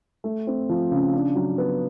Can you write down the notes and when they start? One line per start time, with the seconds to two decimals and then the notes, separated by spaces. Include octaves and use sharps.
0.24 A3
0.47 C4
0.69 F3
0.91 C#3
1.13 D4
1.35 F#3
1.58 B3